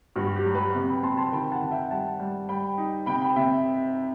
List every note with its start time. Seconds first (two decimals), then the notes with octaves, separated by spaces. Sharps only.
0.16 G2 F#4
0.36 G4
0.46 F#3
0.55 G4 B4
0.75 C3
0.88 G5 B5
1.03 C3 A5 C6
1.17 A5 C6
1.32 D#3 G5 B5
1.52 F#5 A5
1.61 D#3
1.71 E5 G5
1.91 G3 F#5 A5
2.20 G3
2.49 G3 G5 B5
2.78 D#4
3.06 C3 G5 B5
3.21 G5 B5
3.36 C3 E5 G5